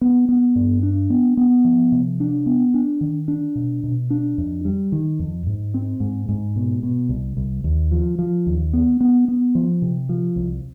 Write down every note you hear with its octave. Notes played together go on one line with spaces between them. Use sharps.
B3
B3
G2
D4
B3
B3
F3
C3
D4
B3
D4
D#3
D4
B2
B2
D4
F2
G3
D#3
F2
G#2
C4
G#2
G#2
B2
B2
C2
C2
D#2
F3
F3
D#2
B3
B3
B3
F3
C3
F3
C2